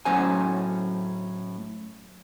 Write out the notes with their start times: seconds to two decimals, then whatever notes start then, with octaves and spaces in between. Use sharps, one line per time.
0.05 A2 F#3 C#4 C5 G#5